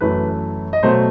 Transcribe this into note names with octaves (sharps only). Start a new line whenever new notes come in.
F#2 E3 A3 B4
D#5
B2 F#3 A3 C5